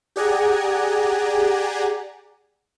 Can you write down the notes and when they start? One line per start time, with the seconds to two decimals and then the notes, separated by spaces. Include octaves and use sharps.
0.16 G4 G#4 D5 F#5 G#5 A#5